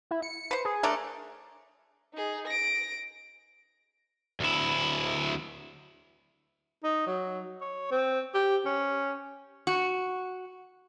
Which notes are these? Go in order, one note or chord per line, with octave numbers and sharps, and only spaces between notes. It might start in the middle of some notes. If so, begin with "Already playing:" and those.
E4
C#7
B4 C5
G#4
A3 D4 A#4
D#4 G#4
A#6 D7
D2 E4
D#4
F#3
C#5
C4
G4
C#4
F#4